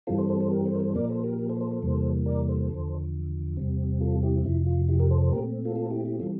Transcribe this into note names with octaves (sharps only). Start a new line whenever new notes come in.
G2 E3 G3 C4 F4 A4
A4 C5
A4 C5
A4 C5
G4 A#4
A4 C5
A#4
A4 C5
A#2 F3 A#3 A#4 D5
A4 C5
G4 A#4
G4 A#4
A4 C5
A4 C5
A4 C5
E2 C3 E3 G3 A#3
A#4 D5
A4 C5
E2 D3 F3
E2 C3 G3 C4
F4 A4
E4 G4
F2 C3 F3 E4
F4
E4 G4
G4 A#4
A4 C5
A4 C5
A#2 A3 C4 G4 A#4
F4 A4
F4 A4
E4 G4
E4 G4
E3 G3 C4 F4 A4